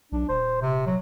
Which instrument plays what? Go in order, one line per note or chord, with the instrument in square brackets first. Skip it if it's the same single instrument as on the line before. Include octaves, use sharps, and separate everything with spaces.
[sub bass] B1 [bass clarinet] D4
[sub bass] D#1 [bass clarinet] C5
[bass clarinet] C3
F#3